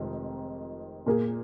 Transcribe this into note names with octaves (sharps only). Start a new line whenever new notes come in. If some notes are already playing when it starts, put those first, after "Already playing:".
Already playing: F1 F2 D#3 G#3 D#4
A#2 A#3 G#4